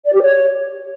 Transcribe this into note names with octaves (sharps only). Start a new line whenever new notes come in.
D5
G4
C#5